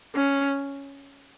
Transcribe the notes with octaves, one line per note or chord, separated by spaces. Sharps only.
C#4